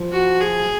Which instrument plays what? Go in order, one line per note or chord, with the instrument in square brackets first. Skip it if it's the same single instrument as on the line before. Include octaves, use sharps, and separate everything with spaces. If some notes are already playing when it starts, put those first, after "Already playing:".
Already playing: [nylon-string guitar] F3
[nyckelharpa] F#4
G#4